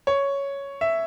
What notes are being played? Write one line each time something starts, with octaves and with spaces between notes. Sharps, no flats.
C#5
E5